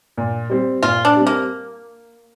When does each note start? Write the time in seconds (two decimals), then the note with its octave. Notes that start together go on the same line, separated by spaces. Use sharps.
0.18 A#2
0.50 G3 C4
0.83 A#2 F4
1.05 D4
1.16 G3 C4
1.27 A#3